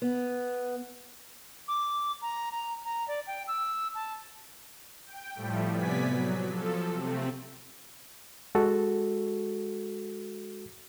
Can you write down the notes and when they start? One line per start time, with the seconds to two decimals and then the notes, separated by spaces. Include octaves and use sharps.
0.02 B3
1.68 D6
2.22 A#5
2.52 A#5
2.85 A#5
3.08 D5
3.27 G5
3.48 E6
3.95 A5
5.06 G5
5.35 A2 F3 G3 A3
5.69 C3 B3 D5 G#5 B6
6.09 F#3
6.49 F3 A4
6.91 C3 A3 C4
8.55 G#3 F#4 A4